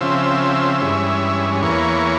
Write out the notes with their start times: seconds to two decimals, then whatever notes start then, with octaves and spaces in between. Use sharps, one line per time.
0.01 C#3 F3 C4 E5
0.81 G2 E3 G#3 C#4
1.62 E2 E3 A#3 C#5